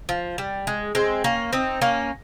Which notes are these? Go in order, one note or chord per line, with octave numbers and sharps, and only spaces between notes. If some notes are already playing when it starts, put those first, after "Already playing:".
F3
G3
G#3
G#3 C4
A#3 C#4
C4 D#4
A#3 C#4